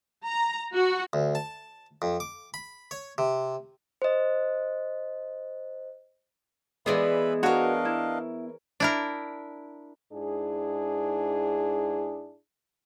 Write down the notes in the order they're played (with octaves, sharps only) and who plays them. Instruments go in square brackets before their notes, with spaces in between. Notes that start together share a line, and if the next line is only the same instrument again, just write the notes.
[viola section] A#5
F#4
[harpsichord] D2
A5
F2
D6
B5
C#5
C3
[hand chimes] C5 D#5
[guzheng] E3 G#3 G#4 [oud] B3 D5 [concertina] B4 E5 B5
[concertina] D4 D#5 F5 [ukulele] F#4 [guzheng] A#4 C#5
[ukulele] E4
[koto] D4 E4 A#4
[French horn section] G#2 D4 E4 G#4